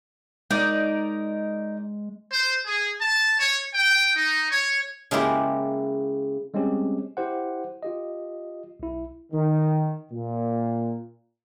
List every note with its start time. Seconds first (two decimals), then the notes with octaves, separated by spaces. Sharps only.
0.51 G#3 D#4 A#4 D5
2.32 C5
2.65 G#4
3.00 A5
3.40 C#5
3.74 G5
4.16 D#4
4.51 C#5
5.11 C#3 G#3 A#3 E4 G4
6.54 G3 G#3 C4 C#4 G4
7.17 E4 G4 C5 F#5
7.83 F4 G4 D#5
8.80 B1 E4
9.32 D#3
10.12 A#2